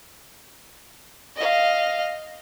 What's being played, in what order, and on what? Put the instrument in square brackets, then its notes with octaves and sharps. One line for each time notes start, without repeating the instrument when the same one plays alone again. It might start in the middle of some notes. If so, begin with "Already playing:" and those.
[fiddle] D#5 F5